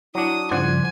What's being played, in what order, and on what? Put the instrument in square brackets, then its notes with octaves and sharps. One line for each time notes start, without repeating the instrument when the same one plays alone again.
[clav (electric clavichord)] F#3 D4 [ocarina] E4 [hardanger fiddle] D#6
[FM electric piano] G2 C#3 F3 [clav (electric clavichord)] C5 D5 F#5 [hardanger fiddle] G#5